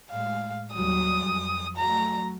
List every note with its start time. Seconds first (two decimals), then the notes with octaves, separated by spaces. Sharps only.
0.11 A2 G#3 F5
0.74 D#2 F#3 G3 D#6
1.25 F2
1.77 F#3 A3 A#5